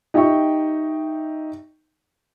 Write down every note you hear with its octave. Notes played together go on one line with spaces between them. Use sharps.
D#4 G4 E5 G5 C#6